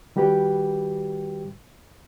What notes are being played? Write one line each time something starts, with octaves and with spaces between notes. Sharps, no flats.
D#3 G3 F#4 G4 B4 G5